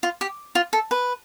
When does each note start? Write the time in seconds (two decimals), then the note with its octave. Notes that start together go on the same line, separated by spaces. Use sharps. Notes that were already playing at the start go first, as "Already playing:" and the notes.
0.03 F4
0.21 G4
0.55 F4
0.73 A4
0.91 B4